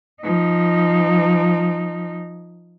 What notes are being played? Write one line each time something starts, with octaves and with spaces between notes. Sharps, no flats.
F3 D#4